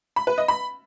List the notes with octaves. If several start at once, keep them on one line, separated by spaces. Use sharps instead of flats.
B5
B4
D#5
B5